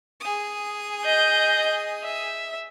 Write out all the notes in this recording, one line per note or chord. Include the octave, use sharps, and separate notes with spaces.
G#4 D#6
D#5 G6
E5